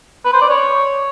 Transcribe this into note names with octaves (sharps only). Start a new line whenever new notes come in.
B4
C5
D5
C#5